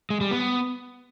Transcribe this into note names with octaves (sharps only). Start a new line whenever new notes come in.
G#3
G3
B3